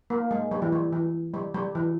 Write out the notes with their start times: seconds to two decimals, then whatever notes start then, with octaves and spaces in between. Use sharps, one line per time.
0.10 A#3
0.31 G#3
0.51 G3
0.62 E3
0.72 G3
0.93 E3
1.34 G3
1.54 G3
1.75 E3